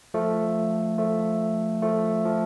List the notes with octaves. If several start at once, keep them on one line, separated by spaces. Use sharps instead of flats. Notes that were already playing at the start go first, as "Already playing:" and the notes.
F3 A3
F3 A3
F3 A3
F3